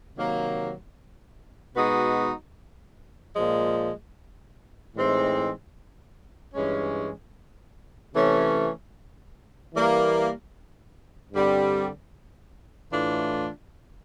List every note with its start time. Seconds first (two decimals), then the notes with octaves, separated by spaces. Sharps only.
0.16 C3 D#3 F#3 A#3
1.75 B2 G#3 B3 D#4 F#4
3.35 A#2 F3 G#3
4.95 A2 E3 G#3 C4 D#4
6.54 G2 E3 G#3 C#4
8.13 C3 E3 A3 C#4
9.73 E3 G3 A#3
11.32 G2 D3 G3 C4
12.91 A2 E3 A3 D4 F4